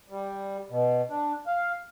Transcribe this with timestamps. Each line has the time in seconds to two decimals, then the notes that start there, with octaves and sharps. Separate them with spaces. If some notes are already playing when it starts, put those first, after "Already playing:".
0.10 G3
0.70 B2
1.09 D4
1.47 F5